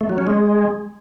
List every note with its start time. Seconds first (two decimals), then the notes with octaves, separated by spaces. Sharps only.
0.01 A3
0.09 F#3
0.18 C#4
0.27 G#3